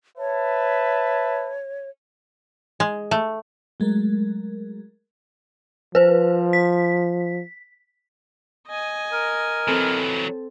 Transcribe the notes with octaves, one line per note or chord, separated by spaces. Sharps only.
B4 C#5 E5 A5
G#3
A3
F#3 G#3 A3 A#4
F3 B4 C5
B6
D#5 G#5
A#4
E3 F#3 C4 A4